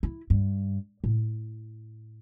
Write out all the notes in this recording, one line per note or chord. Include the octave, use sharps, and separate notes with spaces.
E4
G2
A2